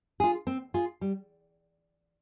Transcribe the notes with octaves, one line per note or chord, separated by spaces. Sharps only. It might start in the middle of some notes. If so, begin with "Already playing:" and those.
F4 G#4
C4
F4 G#4
G3